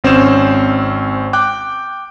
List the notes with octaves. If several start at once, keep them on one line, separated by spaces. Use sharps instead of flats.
G#1 C4 C#4 C5 E7
G5 D6 F#6